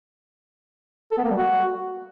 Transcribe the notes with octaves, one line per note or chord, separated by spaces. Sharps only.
A4
B3
A#3
G3
F#4